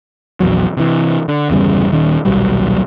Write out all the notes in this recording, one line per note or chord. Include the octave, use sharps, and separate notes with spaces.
A#1 E2 F#3
C3 E3
D3
G1 E2 C#3 G3
D#1 D#3 C#4
D#1 B1 F#3 G3